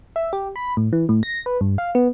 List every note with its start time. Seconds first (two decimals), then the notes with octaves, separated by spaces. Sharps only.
0.16 E5
0.33 G4
0.56 B5
0.77 A2
0.93 E3
1.09 A2
1.23 A#6
1.46 B4
1.61 G2
1.78 F5
1.95 B3